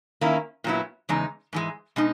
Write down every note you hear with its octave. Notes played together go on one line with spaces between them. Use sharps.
D#3 A#3 C#4 E4
A#2 F#3 B3 E4
E2 C#3 G#3 D#4
G#2 E3 G#3
B2 G#3 D#4